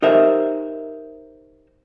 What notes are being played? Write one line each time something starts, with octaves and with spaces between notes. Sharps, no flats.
D#4 G4 A#4 C5 E5